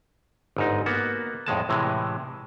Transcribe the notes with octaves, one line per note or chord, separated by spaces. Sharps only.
G1 G#2 D#4
A#3 B3 F#4
F2 A2 G#3 A5
A2 C3 E3 G#3